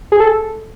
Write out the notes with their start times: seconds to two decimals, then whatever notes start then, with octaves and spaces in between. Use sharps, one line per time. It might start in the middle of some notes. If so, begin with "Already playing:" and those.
0.12 G#4
0.20 A4